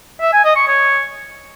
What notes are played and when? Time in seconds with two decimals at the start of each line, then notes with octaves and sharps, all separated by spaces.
0.21 E5
0.33 G#5
0.45 D#5
0.56 C#6
0.68 C#5